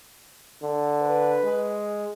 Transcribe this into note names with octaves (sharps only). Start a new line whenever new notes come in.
D3
B4
G#3